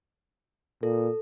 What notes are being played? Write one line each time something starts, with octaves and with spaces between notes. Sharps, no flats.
A#2 A4